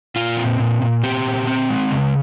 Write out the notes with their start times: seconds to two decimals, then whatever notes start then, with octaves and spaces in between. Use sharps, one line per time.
0.16 A#2 F4
0.37 C4
0.60 A#2
0.82 A#2
1.03 C4 G4
1.26 A#2
1.47 C4
1.70 G#3
1.91 C#3